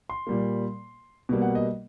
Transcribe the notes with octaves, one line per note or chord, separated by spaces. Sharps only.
C6
A#2 G3 A#3
B2 G3 A#3
F#5
D#5